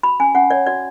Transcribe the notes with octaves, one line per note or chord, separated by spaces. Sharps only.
F#4 B5
C#4 G#5
C#4 F#5
C#5 D5
F#4 D5